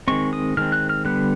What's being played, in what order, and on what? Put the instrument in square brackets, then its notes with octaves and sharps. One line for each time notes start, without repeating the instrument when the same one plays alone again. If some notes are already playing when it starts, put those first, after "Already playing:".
[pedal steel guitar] D#3 G#3 C4 C#6
D#6
D#3 G#3 C4 F6
F#6
F6
D3 G3 B3 F#6